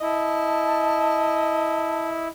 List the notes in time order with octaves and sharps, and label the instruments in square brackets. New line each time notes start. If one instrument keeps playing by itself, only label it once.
[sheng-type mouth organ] E4 [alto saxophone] D#5 [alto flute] A5